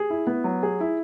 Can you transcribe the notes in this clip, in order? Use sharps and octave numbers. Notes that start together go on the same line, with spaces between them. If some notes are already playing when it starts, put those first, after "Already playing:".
Already playing: G#4
E4
B3
F#3
G#4
E4